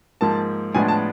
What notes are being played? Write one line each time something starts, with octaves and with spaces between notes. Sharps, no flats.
G#2 F3 A#3 A5
A2 F3 G#3 B3 D4 G#5
A5